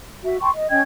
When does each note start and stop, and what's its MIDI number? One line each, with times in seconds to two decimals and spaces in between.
0.24 0.37 66
0.24 0.37 76
0.41 0.49 79
0.41 0.49 81
0.41 0.49 84
0.41 0.49 85
0.54 0.68 75
0.70 0.81 61
0.70 0.81 75
0.70 0.81 79
0.70 0.81 92